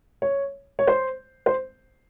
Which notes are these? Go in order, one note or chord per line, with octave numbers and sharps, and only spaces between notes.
C#5
C#5
C5
C5